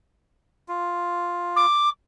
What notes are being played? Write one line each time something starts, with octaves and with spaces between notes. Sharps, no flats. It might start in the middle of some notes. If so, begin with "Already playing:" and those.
F4
D6